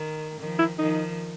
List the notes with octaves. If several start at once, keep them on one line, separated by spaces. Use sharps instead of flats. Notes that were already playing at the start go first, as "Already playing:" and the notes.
Already playing: D#3
D#3 F3
E4
D#3 F3 D#4